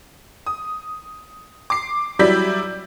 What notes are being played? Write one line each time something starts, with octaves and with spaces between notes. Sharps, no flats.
D#6
D6 C7
F#3 G3 E4 D5 G6 B6